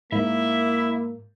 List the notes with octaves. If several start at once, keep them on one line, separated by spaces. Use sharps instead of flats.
G#2 A#3 E4 E5